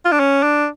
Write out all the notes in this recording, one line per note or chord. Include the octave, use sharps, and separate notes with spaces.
F4
D4
C#4
D4